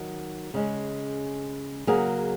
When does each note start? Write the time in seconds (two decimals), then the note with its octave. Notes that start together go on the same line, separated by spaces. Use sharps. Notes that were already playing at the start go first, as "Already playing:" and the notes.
Already playing: D#3 F#3
0.54 C#3 G#3 C#4
1.87 C#3 F#3 A#3 C#4 G#4